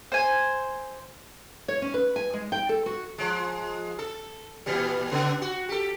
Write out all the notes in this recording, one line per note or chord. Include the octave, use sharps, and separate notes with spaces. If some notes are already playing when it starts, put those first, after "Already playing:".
C5 G#5
C#5
C#4
B4
G#5
G#3
G5
A4
F#4
F3 G#3
A4
A#2 E3 G3
C#3 B3 D4
F#4
G4 A4